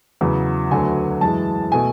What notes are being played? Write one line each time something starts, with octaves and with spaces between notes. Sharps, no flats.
E2 C#3 F#3
D2 D3 F#3 A3 G#5
F#2 E3 G#3 A5
B2 A3 G#5